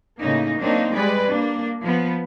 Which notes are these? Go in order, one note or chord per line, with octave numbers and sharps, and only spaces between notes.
A2 C#3 A#3 D#4
F#3 A#3 C4 D4 D#4
G3 G#3 B4 D5
A#3 D4
F3 B3